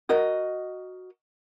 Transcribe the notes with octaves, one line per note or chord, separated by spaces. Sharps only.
F#4 A#4 D#5